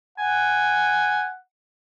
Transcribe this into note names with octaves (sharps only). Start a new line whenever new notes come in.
F#5 G#5